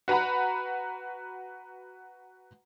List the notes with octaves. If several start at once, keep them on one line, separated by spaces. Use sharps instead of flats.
F#4 B4 F#5 A#5 B5